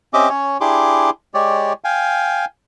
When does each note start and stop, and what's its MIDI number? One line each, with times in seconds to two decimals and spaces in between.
0.13 0.29 60
0.13 0.29 61
0.13 0.29 67
0.13 0.29 75
0.13 0.29 76
0.13 0.29 86
0.29 0.57 61
0.29 0.57 73
0.61 1.10 62
0.61 1.10 64
0.61 1.10 67
0.61 1.10 68
0.61 1.10 84
0.61 1.10 86
1.34 1.73 56
1.34 1.73 67
1.34 1.73 73
1.34 1.73 74
1.84 2.45 77
1.84 2.45 79
1.84 2.45 80